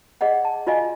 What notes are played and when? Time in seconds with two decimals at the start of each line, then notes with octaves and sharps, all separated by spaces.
0.21 G#4 D5 D#5 F#5
0.45 A5
0.67 F4 F#4 D5 D#5 F5 G#5